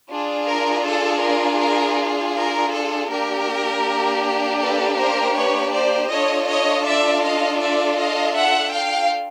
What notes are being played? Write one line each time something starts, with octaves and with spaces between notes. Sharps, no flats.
D4 F4 G#4
A#4
A4
A#4
A#4
A#4
A4
A#3 D4 G4 A#4
A4 B4
A#4 C5
B4 C#5
C5 D5
D4 F4 A4 C#5 D#5
C#5 D#5
D5 E5
D#5 F5
D5 E5
D#5 F5
E5 F#5
F5 G5